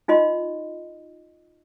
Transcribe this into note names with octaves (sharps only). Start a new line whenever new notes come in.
D#4 F4 D#5 C6